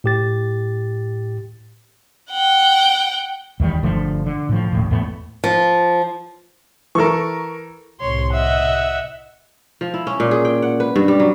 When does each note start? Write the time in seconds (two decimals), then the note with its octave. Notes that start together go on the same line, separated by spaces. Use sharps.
0.04 A2 G4 A6
2.31 F#5 G5
3.60 E2 D#3 E3 G3
3.83 G1 D3 F3 A3
4.26 D3
4.49 A2 F3
4.72 D#1 A2
4.90 E2 A2 A3 B3
5.44 F3
6.95 E3 A4 A#4 C#6
8.01 C2 A2 C3 C#5 C6
8.33 D#5 E5 F#5
9.81 F3
9.94 E4
10.07 C#4
10.20 A#2
10.31 G#4
10.45 G5
10.62 F#5
10.80 B4
10.96 G2
11.08 G3
11.20 F#3